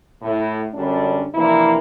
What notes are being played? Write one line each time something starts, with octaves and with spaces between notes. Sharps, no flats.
A2
F#2 D3 G3 C#4 D4
C3 E3 F3 A#3 D4 E4